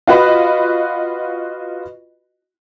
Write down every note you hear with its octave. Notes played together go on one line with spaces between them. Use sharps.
F4 F#4 B4 D#5 B5